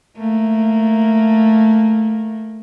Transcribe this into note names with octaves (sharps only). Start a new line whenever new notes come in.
A3 A#3